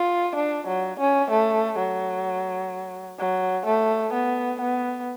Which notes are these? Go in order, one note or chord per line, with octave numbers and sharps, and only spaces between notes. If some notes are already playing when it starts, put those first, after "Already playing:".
Already playing: F4
D4
F#3
C#4
A3
F#3
F#3
A3
B3
B3